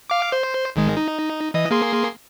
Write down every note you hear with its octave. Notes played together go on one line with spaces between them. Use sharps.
F5 D6
C5
G#1 D#3 G#3
D#4
E3 D#5
A#3 G#4 C6